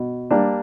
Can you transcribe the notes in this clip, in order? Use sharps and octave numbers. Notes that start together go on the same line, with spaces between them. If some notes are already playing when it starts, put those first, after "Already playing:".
Already playing: B2
G3 A#3 D4